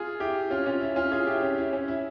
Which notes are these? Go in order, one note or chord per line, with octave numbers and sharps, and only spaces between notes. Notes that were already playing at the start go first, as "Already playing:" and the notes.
Already playing: F4 G#4
E4 G4
C#4 F4
C#4 F4
E4
C#4 F4
F4 G#4
E4 G4
C#4
E4
C#4
E4